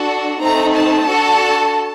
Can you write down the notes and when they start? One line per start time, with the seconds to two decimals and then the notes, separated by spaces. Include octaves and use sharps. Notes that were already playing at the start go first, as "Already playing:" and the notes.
Already playing: D4 F#4 A4
0.39 A3 C4 D#4 A#5
0.74 A5
1.08 D4 F#4 A4